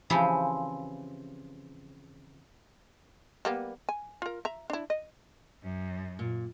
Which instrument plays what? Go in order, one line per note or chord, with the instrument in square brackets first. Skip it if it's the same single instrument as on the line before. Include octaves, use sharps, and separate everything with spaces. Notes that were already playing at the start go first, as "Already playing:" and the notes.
[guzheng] C#3 E3 F3 C4 G4 G#4
[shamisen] G3 A#3 B3
G#5
F4 A#4
E5 A#5
D4 E4
D#5
[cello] F#2
[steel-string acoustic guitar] A#2